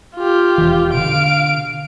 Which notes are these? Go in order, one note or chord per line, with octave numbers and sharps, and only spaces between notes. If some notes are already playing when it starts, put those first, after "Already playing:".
F4 G4
E1 E3
B2 D3 F5 D7